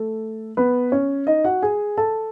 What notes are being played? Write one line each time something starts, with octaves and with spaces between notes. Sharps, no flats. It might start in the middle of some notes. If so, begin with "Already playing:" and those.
Already playing: A3 A4
B3 B4
C#4 C#5
D#4 D#5
F#4 F#5
G#4 G#5
A4 A5